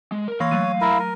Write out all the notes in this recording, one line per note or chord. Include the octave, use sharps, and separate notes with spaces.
G#3
A#4
E3 A#3 C#5 F5 C6
F#3 A3 D#7
E4 A#4
A#4